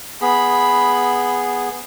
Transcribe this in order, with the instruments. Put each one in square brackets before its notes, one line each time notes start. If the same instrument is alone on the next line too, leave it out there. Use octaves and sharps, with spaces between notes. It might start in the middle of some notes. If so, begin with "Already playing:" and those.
[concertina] B3 G#4 [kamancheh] B5